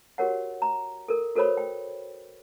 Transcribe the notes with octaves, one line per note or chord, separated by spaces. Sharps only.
F#4 G4 A#4 C#5 F#5
A#5
A4 A#4
F#4 A4 A#4 C5 C#5 B5
G5